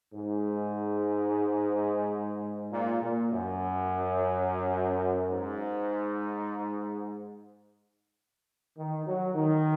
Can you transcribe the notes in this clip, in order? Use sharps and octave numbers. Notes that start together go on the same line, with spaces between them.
G#2
A#2
A#2
F#2
G#2
D#3
F#3
D#3